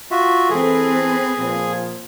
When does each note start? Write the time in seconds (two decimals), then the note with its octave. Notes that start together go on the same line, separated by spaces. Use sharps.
0.11 F4 F#4 E5
0.50 E3 C4 G#4 A4 B4
1.39 A#2 F3